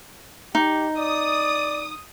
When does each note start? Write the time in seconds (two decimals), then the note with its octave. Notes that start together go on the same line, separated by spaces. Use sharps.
0.55 D#4 G4
0.97 D5 D#6